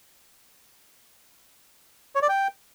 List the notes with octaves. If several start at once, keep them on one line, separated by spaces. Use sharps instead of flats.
C#5
D5
G5